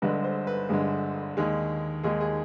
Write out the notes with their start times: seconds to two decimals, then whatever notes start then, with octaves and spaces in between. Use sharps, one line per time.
0.02 G1 G2 D3 G#3 B4
0.24 C5
0.47 B4
0.69 G1 G2 D3 G#3 G#4
1.37 D#2 D#3 G#3 G#4
2.03 D#2 D#3 G#3 G#4
2.21 G#4